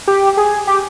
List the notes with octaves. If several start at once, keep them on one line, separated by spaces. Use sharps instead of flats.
G4
G#4
G4